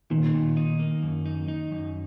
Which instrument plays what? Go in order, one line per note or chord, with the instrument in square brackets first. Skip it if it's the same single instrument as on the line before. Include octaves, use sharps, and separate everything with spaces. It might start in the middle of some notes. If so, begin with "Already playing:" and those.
[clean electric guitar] A#2 [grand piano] D#3
[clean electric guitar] A#2
D#4
A#3
F#2
D#4
D#4
F#2